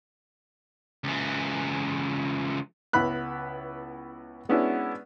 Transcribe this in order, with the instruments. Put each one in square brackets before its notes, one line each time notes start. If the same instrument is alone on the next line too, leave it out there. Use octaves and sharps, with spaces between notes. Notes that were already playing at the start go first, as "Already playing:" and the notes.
[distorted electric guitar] C#2 E3
[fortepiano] C#2 B3 E4 B5 F#6
G#3 B3 C#4 D4 E4 F#4